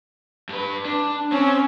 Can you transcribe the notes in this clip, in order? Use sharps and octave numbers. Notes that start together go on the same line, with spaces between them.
G2 B4
D4
C4 C#4